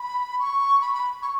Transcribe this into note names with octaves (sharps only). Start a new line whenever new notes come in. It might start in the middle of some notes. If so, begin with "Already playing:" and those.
Already playing: B5
C#6
B5
B5
C#6